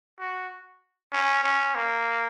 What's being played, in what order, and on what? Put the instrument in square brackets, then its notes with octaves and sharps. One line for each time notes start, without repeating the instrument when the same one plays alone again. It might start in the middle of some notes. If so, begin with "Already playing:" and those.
[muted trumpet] F#4
C#4
C#4
A#3